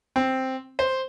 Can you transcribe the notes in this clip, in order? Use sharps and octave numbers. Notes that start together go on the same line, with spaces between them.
C4
C5